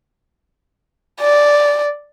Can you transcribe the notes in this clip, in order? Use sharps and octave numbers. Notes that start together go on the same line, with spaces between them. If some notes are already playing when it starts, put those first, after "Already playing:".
D5